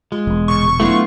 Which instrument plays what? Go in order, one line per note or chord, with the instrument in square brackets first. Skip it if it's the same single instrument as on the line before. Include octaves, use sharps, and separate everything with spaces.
[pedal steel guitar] G#3 [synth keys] F4
[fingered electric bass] E1
[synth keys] A#2 C#3 [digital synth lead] C#6
[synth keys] F#3 D4 E4 [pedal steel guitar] A3 B3 F4